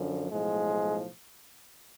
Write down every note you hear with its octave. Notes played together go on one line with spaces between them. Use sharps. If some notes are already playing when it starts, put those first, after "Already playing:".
Already playing: F#2 D3 F3
B1 A2 F3 G#3